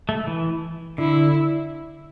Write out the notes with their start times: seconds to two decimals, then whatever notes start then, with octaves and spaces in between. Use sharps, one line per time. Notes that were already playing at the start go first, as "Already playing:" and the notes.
0.09 A3
0.27 E3
0.98 D3 E4